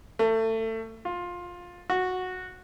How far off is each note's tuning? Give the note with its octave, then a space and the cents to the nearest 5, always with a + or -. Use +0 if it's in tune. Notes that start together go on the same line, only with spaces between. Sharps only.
A3 +25
F4 +15
F#4 -10